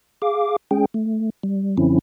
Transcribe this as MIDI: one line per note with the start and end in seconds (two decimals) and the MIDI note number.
0.22 0.56 68
0.22 0.56 77
0.22 0.56 86
0.71 0.85 56
0.71 0.85 61
0.71 0.85 68
0.71 0.85 79
0.94 1.30 57
1.43 1.77 55
1.78 1.99 42
1.78 1.99 50
1.78 1.99 53
1.78 1.99 60
1.78 1.99 61
1.78 1.99 64